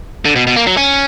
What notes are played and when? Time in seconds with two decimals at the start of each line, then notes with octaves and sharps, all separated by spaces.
0.25 D3
0.36 B2
0.47 B2
0.56 A#3
0.67 F#3
0.77 C#4